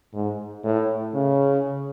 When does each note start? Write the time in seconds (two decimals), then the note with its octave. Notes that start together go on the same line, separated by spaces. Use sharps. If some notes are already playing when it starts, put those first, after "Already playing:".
0.13 G#2
0.64 A2
1.14 C#3